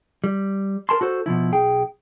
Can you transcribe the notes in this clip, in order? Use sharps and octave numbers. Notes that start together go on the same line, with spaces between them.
G3
A#4 A5 C6
F#4 A4 C5
B2 D#3 F3 E4
B1 G#4 G5